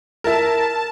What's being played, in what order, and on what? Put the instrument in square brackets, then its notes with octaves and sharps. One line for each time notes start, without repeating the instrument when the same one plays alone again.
[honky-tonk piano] E4 A#4 [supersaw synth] A5